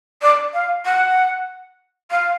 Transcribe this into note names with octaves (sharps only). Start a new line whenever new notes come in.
D5
F5
F#5
F5